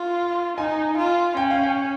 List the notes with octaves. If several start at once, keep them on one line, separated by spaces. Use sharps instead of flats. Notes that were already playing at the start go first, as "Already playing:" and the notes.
Already playing: F4
D#4 G#5
F4
C#4 G5
F5
G5